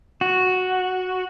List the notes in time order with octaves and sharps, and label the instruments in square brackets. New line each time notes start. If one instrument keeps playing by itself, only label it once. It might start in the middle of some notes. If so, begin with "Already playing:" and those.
[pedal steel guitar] F#4